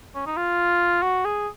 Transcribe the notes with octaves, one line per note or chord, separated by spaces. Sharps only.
C#4
D#4
F4
F#4
G#4